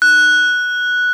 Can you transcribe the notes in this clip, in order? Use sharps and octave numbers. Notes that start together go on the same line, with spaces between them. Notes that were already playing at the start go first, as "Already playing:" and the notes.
F#6